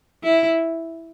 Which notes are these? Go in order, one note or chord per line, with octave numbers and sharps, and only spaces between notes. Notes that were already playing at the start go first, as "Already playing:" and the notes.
E4